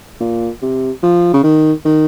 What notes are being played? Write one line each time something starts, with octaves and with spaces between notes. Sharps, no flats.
A#2
C3
F3
C#3
D#3
D#3